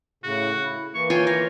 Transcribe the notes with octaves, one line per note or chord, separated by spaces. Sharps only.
A2 C#3 F#4
E4
E3 A#3 C#6
F4 C#5 G5 G#5
C#5 F5 A#5